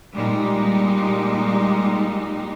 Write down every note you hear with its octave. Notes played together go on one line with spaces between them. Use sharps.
A#2 G3 G#3 D#4